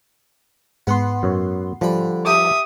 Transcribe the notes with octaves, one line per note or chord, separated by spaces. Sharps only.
G#2 B3 F#5 C6
F#2 C#5
D3 F3 G3 B5
G4 E5 D#6